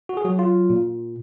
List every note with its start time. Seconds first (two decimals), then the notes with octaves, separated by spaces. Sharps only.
0.09 F#4
0.17 G#4
0.25 F#3 F#4
0.39 F4
0.70 A#2